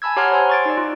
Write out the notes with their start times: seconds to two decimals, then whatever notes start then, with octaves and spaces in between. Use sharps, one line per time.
0.02 G#5 A5 B5 E6 G#6
0.16 G4 C#5 F#5 A#5 C6 F6
0.32 C5 G#5 C6
0.50 C#6 A6 D7
0.65 D#4 D5
0.77 F4